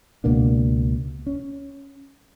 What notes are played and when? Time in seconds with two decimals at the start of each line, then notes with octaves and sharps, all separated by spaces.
0.24 C#2 B2 A#3 D4
1.27 C#4